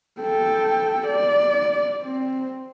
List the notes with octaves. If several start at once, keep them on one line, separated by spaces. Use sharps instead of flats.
A4 G5
D5
C4